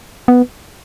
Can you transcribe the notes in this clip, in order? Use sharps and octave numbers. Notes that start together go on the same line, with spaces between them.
B3